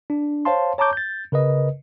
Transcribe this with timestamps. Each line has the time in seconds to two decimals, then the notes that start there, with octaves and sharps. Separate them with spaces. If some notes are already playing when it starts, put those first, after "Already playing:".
0.10 D4
0.45 C5 C#5 F5 A5 C6
0.78 C#5 A5 A#5 C#6 D6 G6
0.93 G6 A6
1.32 C#3 A#4 B4 D#5